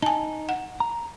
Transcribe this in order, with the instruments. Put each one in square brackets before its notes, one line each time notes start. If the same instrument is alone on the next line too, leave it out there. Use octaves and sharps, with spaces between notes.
[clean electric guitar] D#4 [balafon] G#5 A5
[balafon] F#5
[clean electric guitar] A#5